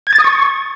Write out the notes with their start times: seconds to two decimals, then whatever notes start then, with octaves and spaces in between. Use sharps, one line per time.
0.07 G#6
0.13 A6
0.18 D#6
0.24 C#6